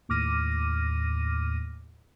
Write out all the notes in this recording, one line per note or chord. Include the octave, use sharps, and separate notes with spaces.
D#2 A2 D6 F6 A#6 D#7